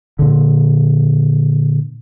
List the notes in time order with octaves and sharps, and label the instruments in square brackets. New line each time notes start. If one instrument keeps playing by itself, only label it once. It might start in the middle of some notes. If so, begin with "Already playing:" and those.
[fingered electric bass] A#2 D3